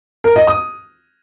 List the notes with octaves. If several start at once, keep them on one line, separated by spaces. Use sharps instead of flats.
A#4
D#5
D#6